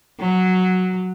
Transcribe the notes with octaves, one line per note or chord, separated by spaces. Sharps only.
F#3